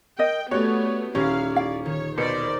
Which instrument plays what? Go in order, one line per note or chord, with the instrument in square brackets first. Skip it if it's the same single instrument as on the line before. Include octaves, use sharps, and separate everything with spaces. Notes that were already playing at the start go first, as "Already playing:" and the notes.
[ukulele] A#4 D#5 [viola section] G5
[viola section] A3 B3 [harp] C#4 G4 D5 [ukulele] F#4 [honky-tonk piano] C#5
[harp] D#1 G4 A#5 [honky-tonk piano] C#4 [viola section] E4 F5
[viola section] D5 [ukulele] F5
[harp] D#3 [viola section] C#5
[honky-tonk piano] B2 [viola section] A#4 C5 D5 [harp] C#7